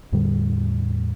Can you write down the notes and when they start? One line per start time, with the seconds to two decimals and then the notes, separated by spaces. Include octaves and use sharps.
0.12 E2 A2 D3 G3